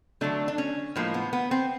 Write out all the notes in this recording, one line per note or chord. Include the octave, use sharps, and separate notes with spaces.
D3 F#3 A3 D4
D4
C#4
A2 F3 G#3 A#3
B3
B3
C4